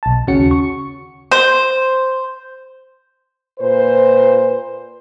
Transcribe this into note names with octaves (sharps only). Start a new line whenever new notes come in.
B1 A5
D#2 C#3 C#4 F#4 C#7
C#6
C5
A#2 B4 C5